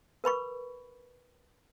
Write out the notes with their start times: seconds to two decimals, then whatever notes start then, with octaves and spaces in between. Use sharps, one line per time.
0.24 A#4 B4 B5 C#6